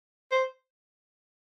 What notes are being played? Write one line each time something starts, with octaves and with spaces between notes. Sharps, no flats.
C5